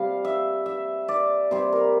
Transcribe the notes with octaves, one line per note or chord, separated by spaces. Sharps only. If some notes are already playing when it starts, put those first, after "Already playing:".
Already playing: C3 G3 F5
E5
E5
D5
C3 G3 C5
A#4